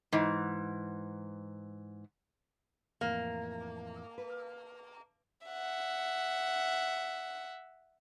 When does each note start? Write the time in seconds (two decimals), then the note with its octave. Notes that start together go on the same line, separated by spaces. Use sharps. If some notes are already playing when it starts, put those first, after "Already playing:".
0.12 G#2 E3
3.01 F2 A2 E3 A#3
4.18 B4
5.47 E5 F#5